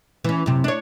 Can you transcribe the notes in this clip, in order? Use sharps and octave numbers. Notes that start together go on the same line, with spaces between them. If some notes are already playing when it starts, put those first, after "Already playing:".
E3 C#4
F#2 C3
D4 C#5